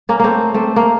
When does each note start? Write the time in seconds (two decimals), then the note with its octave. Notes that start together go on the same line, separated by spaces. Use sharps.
0.09 A#3 C#4
0.20 A3 A#3 C4
0.54 A3 C4
0.76 A#3